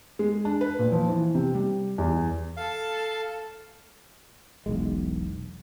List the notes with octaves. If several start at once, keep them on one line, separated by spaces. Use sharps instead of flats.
G#3
D4
B4
A#2
F3
E3
C3
G3
E2
A4 F5
E1 B1 G#3